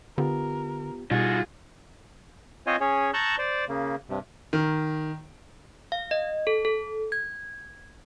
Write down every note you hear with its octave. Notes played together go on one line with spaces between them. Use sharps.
D3 B3 F4 G4 A#4
B2 G3 D#4 F4 F#4 G#4
C4 F4 C5 C#5 D#5 G#5
C#4 G#4 C#5
A5 A#5 C#6 E6 F#6 G6
C5 D5
C#3 A#3
G2 C3
D#3
F5
D#5
A4
A4
G#6